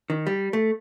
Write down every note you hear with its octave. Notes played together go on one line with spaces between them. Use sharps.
D#3
G3
A3